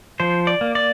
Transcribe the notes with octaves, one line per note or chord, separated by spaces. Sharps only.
F3 C5
D5
A#3
D5